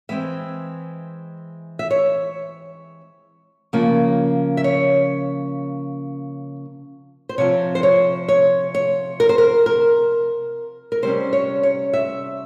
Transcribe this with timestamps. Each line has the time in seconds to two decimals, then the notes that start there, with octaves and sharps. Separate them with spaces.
0.09 E3 G#3 C4 E5
1.79 E5
1.91 C#5
3.73 C#3 F3 A#3 C#4
4.57 E5
4.64 C#5
7.29 C5
7.38 C3 F3 C4 C#5
7.75 C5
7.83 C#5
8.29 C#5
8.75 C#5
9.20 A#4
9.29 C5
9.38 A#4
9.66 A#4
10.92 A#4
11.02 C3 G3 C#4 C5
11.33 C#5
11.63 C#5
11.93 E5